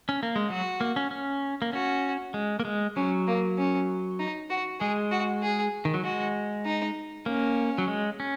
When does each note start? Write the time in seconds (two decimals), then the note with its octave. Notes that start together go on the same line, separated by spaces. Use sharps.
0.09 C#4
0.23 A#3
0.36 G#3
0.50 F#3 F#4
0.81 A#3
0.96 C#4
1.11 C#4
1.62 A#3
1.73 C#4 F#4
2.34 G#3
2.60 A#3
2.65 G#3
2.96 F#3 C#4
3.27 A#3
3.58 C#4
4.19 D#4
4.50 F#4
4.80 G#3 G#4
5.12 F#4
5.42 G#4
5.85 D#3
5.94 F#3
6.04 G#3 F#4
6.65 D#4
7.26 A#3 C#4
7.78 F#3
7.88 G#3
8.20 C#4